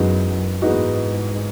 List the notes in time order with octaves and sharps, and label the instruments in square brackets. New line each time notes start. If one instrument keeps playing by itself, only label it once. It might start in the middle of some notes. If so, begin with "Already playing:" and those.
Already playing: [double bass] F#2 [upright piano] E3 G#3 B3 D#4 F#4
[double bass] G#2 [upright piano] E3 G#3 B3 D#4 F#4